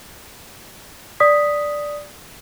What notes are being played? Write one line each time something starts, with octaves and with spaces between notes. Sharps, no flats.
D5 D#6 B6